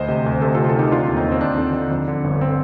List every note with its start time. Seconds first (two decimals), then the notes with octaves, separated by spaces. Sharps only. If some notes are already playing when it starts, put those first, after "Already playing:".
Already playing: D2 C5 D#5
0.08 C3
0.26 D2
0.42 C3 A4 C5
0.55 F4 A4
0.59 C3
0.69 A4
0.75 D#3 D#4 G4
0.91 D3 D4 F4
1.08 D#2
1.17 C4 D#4
1.24 D#2
1.32 C4
1.41 D#2 D4
1.58 D3
1.74 D3
1.91 F2
2.08 D3
2.24 G1
2.41 C4